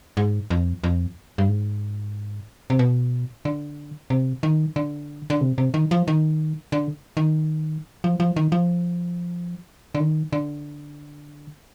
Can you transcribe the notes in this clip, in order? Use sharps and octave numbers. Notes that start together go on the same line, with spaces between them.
G#2
F2
F2
G2
G#2
C3
B2
D3
C3
D#3
D3
D3
C3
C3
D#3
F3
D#3
D3
D#3
F3
F3
D#3
F3
D3
D#3
D3